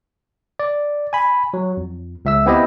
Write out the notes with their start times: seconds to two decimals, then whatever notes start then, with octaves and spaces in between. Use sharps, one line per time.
0.59 D5
1.13 G#5 B5
1.54 F#3
1.77 F2
2.25 C#2 E5 E6
2.46 B3 C4 E4 G4 D#5